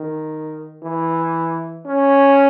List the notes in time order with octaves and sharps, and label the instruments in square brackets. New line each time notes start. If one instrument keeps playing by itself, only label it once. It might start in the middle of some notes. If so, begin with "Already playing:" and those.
Already playing: [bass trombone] D#3
E3
C#4